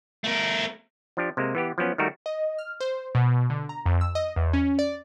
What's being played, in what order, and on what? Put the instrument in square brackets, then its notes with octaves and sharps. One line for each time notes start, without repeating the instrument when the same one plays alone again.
[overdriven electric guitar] A3 A#4
[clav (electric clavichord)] F3 D4 G4
C3 G#3 A#3
E3 B3 G4
F3 F#3 B3 C#4
D#3 G3 A3 F#4 A#4
[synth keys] D#5
F6
C5
B2
D3
A#5
F2
E6
D#5
E2
C#4
D5